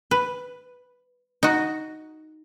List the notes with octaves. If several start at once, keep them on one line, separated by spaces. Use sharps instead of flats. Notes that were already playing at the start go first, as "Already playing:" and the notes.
B4
D#4 F#4